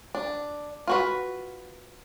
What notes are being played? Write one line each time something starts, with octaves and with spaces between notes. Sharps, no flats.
D4
F4 F#4 B4